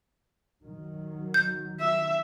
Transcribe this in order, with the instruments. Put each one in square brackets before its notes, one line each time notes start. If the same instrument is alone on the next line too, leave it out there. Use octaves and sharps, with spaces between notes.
[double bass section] D#3 F#3
[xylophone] G6
[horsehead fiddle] E5